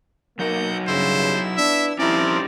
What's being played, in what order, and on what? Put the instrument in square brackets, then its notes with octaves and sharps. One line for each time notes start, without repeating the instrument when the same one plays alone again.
[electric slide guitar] F#3 D#4 F#4 [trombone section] A#3 [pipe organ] F#5 G6
[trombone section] G2 C#3 [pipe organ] E4 E6 [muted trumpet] C5
[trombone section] B3 D4 [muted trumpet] E5
[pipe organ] F3 C4 A#4 [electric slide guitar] C#4 D#4 G4 [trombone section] E4 [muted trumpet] D5